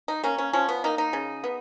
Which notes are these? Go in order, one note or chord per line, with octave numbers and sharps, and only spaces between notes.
D#4
A#3 C#4
C#4
F3 C#4
B3
A#3 D#4
D#4
C#3
B3